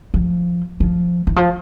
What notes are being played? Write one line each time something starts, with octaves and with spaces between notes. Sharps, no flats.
F3
F3
E3
F3